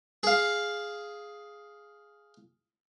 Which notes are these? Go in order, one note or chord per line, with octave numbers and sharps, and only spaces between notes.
G#4 F5